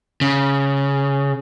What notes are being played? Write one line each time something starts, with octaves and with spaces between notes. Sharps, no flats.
C#3